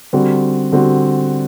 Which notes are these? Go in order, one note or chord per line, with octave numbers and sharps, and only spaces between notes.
D3 G3 C4 F#4
D3 G3 C4 F#4